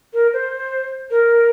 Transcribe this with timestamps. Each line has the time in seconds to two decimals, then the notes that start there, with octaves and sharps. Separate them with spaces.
0.13 A#4
0.33 C5
1.10 A#4